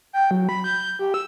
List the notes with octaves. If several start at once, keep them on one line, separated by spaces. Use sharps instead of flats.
G5
F#3
B5
G6
G4
E6